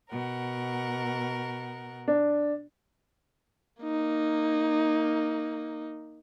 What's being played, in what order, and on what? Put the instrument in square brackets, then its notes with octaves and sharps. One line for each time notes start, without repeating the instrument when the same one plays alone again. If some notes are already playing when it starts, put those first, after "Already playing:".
[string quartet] B2 A#4 F#5
[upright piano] D4
[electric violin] A#3 D#4